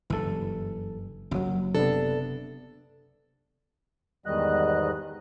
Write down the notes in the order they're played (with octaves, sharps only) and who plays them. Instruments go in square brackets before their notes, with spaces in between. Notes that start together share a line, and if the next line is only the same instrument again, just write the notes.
[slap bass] F#1 G2 [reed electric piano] E3 A4
[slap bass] F#1 [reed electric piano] F#2 F#3
[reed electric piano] C3 B3 [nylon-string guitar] D4 A4
[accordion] E2 G#2 D#3 G3 D#5 F#6